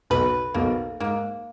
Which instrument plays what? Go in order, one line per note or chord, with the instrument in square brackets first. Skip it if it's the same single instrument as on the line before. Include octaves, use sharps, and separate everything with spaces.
[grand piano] B1 B2 [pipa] B4
[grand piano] B1 B2 [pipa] A#3
[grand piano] G#2 [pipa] A#3